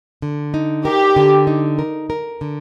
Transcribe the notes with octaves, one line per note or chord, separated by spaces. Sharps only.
D3
D#4
G4 A#4
D3
D#4
A#4
A#4
D3